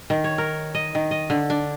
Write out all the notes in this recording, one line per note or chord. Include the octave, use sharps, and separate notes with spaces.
D#3
C#5
A#4
D#5
D#3
D#5
D3
D4